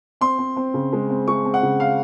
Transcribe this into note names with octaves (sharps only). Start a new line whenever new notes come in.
C4 C6
C4
C4
C#3
G#3
C4
G#3 C#6
C4
F#5
C#3
F5